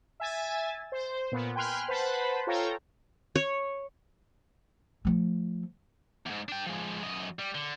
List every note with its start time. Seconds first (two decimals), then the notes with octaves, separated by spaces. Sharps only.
0.20 E5 G#5 A6
0.92 C5
1.32 A#2 B3
1.55 G5 G#5 B5 C6 F6 F#6
1.88 B4 C5 F#5 A5 B5
2.47 F4 A4 C#5 F5 G5 A#5
3.36 C#5
5.05 F3 A3
6.26 E2 G#2
6.49 D4 G5
6.67 F3 G#3
7.02 F#2 D#5
7.39 G3
7.55 D3